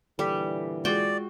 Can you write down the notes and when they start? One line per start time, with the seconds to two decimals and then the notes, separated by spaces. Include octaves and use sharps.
0.19 A#2 D3 E3 G3 A4 B6
0.85 G#3 F4 F#4 G#4 D5 G5